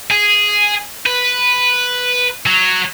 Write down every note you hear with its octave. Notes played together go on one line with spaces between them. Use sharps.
G#4
B4
F#3